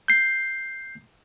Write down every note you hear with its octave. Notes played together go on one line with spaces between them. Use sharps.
G6 C7